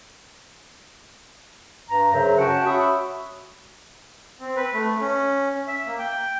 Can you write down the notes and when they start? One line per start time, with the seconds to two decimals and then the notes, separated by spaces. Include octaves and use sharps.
1.90 G2 A#5
2.14 F#2 C#3 F#3 C5 E5
2.38 C#4 F#4 F#5 G5 A5
2.66 F#4 C#5 E5 B5 D#6
4.40 C4
4.56 B4
4.74 A3
5.01 C#4
5.67 E5
5.86 A#3
5.99 G5